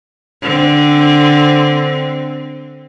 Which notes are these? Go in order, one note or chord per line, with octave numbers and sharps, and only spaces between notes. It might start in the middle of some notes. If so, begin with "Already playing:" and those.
D3 C4